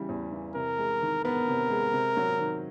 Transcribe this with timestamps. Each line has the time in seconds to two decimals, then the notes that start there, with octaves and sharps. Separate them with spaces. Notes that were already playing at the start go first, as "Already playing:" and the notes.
Already playing: C#3 E3 G3
0.09 E2
0.32 E3
0.55 C3 A#4
0.78 G#3
1.02 D#3
1.24 B3 A#4
1.48 C3
1.70 G#3
1.93 C3
2.17 F#3
2.40 D#3